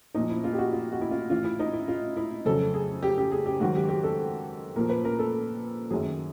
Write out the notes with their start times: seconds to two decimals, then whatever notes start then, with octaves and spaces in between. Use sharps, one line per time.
0.14 A#2 F3 D#4
0.30 E4
0.44 F4
0.53 G4
0.58 F#4
0.72 F4
0.92 F#4
1.01 E4
1.11 F4
1.30 A2 E3 F4
1.45 E4
1.59 D#4
1.73 E4
1.88 F4
2.17 E4
2.45 F2 C#3 F#3 A4
2.74 G#4
3.03 G4
3.18 G4
3.31 G#4
3.46 G4
3.60 G#2 D#3 F#3 F#4
3.75 G4
3.89 G4
4.03 A4
4.76 A#2 F3 A#4
4.89 B4
5.05 A#4
5.19 A4
5.91 F#2 D#3 F#3 G#4